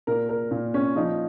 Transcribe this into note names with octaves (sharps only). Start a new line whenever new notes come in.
A#2 A#4
A#4
A#2
C#4
F3 D#4